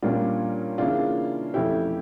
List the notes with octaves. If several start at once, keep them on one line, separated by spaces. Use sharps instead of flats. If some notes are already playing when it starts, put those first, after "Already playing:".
A#2 G3 A#3 C#4 D4 F4
C#3 E3 A#3 C#4 D4 F4
F2 E3 A3 C#4 E4 G4